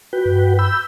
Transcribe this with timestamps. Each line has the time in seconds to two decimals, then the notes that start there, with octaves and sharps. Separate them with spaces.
0.13 F#4 B4 G5
0.25 G2
0.59 B5 E6 G6